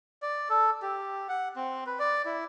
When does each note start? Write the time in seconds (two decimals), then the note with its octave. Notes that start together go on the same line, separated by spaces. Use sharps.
0.22 D5
0.49 A4
0.82 G4
1.29 F#5
1.56 C4
1.87 B4
1.99 D5
2.25 E4